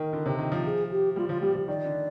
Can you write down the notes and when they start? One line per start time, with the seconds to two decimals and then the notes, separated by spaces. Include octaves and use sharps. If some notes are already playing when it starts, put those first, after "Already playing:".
Already playing: D#3 A#4
0.13 D3
0.26 C3
0.39 D#3
0.52 F3
0.65 G#4
0.91 G4
1.16 G3 F4
1.28 F3 F4
1.42 G3 G4
1.55 F3
1.68 D#3 D5
1.85 D3